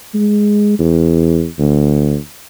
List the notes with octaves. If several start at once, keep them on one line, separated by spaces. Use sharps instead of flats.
G#3
E2
D2